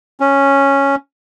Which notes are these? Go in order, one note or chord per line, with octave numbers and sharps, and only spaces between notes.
C#4